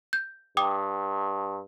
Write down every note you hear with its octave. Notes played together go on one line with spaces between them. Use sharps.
G6
G2 G5 D6 D#6